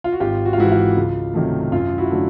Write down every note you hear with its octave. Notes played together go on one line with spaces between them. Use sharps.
F4
F#4
G#1 F4 G4
F#4
F4
G#2 E3 E4 F#4
F4
C#2
C3 D#3 F#3 A3
F#2 F4
E4 F#4
D3 F#3 A3